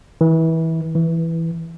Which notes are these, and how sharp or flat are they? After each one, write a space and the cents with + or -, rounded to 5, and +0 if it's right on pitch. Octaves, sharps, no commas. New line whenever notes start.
E3 -25
E3 +0